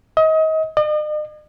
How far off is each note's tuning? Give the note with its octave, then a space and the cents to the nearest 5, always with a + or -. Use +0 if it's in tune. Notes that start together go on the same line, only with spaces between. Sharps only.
D#5 +30
D#5 -45